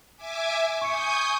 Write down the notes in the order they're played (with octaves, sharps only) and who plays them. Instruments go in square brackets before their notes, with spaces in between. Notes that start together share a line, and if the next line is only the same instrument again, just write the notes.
[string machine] E5 G#5 D6
[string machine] G#5 D#6 G6 [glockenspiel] C#6 C#7